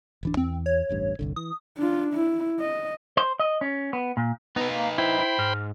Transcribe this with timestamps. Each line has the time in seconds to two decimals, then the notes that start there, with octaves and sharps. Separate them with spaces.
0.23 D1 E3 D4
0.37 E2 E3 C4
0.66 C#5
0.89 E1 A1 G2
1.19 G1 C2 D3
1.36 E3 D#6
1.78 D4 F4
2.15 E4
2.60 D#5
3.17 C5
3.40 D#5
3.61 C#4
3.93 B3
4.17 A#2
4.56 B3 D#4 B4
4.71 A#3
4.98 E4 C5 G5 B5
5.19 E4
5.39 G#2 F6